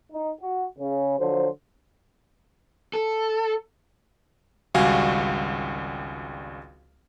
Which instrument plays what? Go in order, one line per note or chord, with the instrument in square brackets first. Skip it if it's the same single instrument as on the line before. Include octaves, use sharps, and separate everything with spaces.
[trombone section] D#4
F#4
C#3
D3 F3 F#3 C5
[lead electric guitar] A4
[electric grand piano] G#1 C#2 G3 F#4 F5 G#5